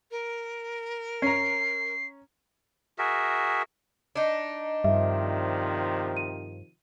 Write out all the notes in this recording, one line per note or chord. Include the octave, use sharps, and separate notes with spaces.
A#4
C#4 A#5 C7
F#4 G#4 A#4 E5
D4 D#4
G2 C3 D#3 F3 E5
D#7